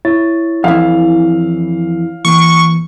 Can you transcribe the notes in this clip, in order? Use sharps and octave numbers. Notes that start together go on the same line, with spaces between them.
E4 C#5 A6
F2 E3 F5
E3 A#3 C#6